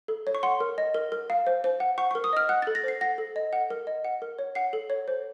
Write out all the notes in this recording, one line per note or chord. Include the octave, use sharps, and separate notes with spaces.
A4
C#5
C#6
F#5 C6
A#4
D#5
A#4
A#4
F5
C5
C5
F#5
F#5 C#6
C#6
A#4
D#6
D#5 F6
F#5 F#6
A6
A4
A#6
C5 C7
F#5 A#6
A4
D#5
F#5
A#4
D#5
F#5
A#4
C#5
F#5 C7
A4
C#5
C5